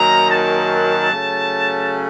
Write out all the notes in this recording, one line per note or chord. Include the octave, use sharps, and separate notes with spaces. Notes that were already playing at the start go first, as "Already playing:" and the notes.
Already playing: F#2 D#3 F#3 A#3 D#4 A#5
A5
C#3 F#3 A3